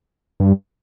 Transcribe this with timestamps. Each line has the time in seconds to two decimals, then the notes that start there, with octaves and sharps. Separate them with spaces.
0.40 G2